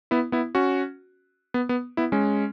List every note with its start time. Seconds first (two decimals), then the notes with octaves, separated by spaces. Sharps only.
0.11 B3 E4
0.32 B3 E4
0.55 C#4 F#4
1.54 B3
1.69 B3
1.97 B3 E4
2.12 G#3 C#4